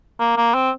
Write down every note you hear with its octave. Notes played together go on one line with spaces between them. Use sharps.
A#3
A#3
C4